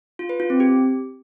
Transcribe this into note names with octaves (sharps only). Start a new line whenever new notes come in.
F4
B4
F4
C4
G4